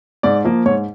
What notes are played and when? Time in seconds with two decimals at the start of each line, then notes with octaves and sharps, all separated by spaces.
0.23 G#2 D5
0.44 F3 A#3
0.66 G#2 C#5